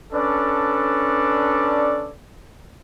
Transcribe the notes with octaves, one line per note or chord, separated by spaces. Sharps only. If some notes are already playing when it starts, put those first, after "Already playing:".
C#4 D4 A4 B4 D5